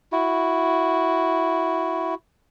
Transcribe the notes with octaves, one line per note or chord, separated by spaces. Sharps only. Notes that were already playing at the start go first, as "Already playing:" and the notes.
E4 F#4